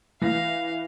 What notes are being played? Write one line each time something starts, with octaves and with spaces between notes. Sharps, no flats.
E3 F5 A#6